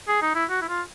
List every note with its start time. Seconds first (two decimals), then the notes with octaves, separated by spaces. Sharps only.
0.08 G#4
0.22 D#4
0.35 E4
0.50 F#4
0.62 E4
0.68 F4